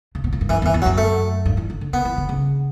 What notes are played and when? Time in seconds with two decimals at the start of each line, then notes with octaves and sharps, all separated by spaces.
0.15 C#3
0.24 B2
0.33 A2
0.41 G2
0.49 F#2 E3
0.62 E2
0.66 E3
0.74 E2
0.82 F#3
0.86 F#2
0.98 A3
1.45 G2
1.57 E3
1.70 D3
1.81 D3
1.93 C#3 B3
2.05 E3
2.18 D3
2.29 C#3